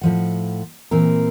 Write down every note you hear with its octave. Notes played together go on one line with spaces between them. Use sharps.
A2 F3 F#5
A#2 E3 C4 A#4